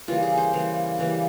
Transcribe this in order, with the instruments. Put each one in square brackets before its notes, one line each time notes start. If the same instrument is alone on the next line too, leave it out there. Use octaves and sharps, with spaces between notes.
[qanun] C#3 E3 G3 A#3 F4
G#4
C5
C#3 E3 G3 A#3
C#3 E3 G3 A#3